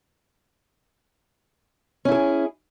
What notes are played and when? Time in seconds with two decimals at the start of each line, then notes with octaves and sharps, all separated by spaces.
2.05 C#4
2.08 E4
2.12 A4
2.15 G#4